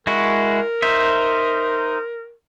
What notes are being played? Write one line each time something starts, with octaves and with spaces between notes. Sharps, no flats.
G#3 E4 F#4 A#4
D#4 C5 E5